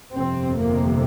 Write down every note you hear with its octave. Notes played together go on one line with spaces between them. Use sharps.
G1 F2 C3 C4
A#3